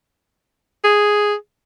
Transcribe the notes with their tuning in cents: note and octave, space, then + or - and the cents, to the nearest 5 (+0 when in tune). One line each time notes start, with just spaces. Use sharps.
G#4 +0